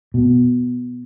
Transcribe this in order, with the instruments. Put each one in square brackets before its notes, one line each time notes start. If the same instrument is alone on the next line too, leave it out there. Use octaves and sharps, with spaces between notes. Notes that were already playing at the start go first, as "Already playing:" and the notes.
[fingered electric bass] B2